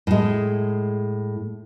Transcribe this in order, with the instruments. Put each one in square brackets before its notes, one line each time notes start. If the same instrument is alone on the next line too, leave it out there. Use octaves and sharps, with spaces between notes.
[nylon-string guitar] A2 G#3